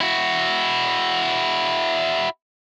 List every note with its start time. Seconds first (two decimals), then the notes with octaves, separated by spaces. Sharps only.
0.01 E4 F#4